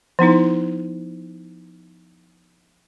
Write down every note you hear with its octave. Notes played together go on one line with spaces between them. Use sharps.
F3 B3 D#4 E4